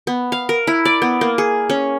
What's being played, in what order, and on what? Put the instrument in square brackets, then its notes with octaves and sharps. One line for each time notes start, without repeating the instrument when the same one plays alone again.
[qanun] B3
F5
A#4
E4
D5
B3
A#3
G#4
C#4